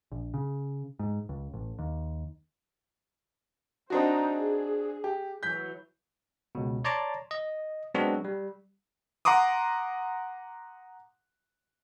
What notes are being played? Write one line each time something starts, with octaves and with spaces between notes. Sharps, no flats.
A#1
C#3
G#2
C#2
A1
D#2
C4 D4 D#4 F#4 C5
G#4
G4
E3 F#3 G6 B6
C#2 B2
C#5 D5 A5 A#5 C6 D6
D#5
F#3 G#3 B3 C4 D4 F#4
G3
F#5 A#5 C6 D6 D#6